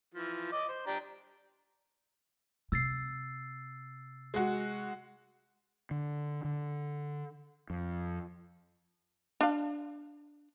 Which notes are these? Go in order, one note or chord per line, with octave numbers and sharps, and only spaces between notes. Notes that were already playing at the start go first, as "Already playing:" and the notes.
E3 F3
D#5 D6
C5
D4 G4 A#5
C3 E6 A6 C7
G#3 F#4
D3
D3
F2
D4 F5